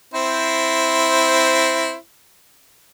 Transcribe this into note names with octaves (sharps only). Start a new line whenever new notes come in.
C4 E4 C5